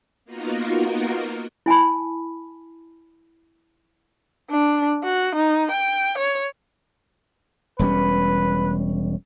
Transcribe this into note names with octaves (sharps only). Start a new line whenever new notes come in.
A#3 B3 D#4 F4 F#4 A#4
E4 G#5 A5 B5
D4
F#4
D#4
G5
C#5
E1 G3 C#4 B4